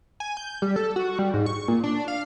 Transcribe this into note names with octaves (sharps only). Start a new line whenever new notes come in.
G#5
G6
G3
A4
F#4
G3
G#2
C#6
A#2
D4
F5